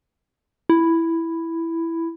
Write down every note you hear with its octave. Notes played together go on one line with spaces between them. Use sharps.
E4